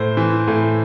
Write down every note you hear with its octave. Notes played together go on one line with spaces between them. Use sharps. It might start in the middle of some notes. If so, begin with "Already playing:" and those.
Already playing: A2 C5
E3
A2